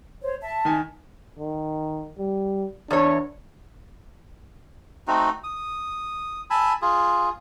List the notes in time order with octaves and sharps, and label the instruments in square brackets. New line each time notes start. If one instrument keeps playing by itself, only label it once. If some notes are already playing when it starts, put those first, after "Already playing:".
[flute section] C5 C#5
E5 A5
[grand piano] D#3 G#5
[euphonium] D#3
G3
[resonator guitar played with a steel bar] E2 C#5 [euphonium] D4
[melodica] A3 C4 D#4 F#4
D#6
G#5 A5 B5 E6
F4 G#4